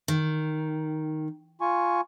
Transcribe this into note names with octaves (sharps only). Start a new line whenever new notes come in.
D#3
F4 G#5 C#6